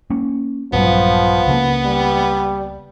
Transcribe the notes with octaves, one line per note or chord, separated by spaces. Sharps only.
A#3 C#4
A#1 G2 F3 F#3 B3
C#2 C#3 A#3
G3